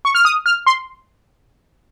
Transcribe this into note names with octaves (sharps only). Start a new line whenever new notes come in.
C#6
F6
D#6
F6
C6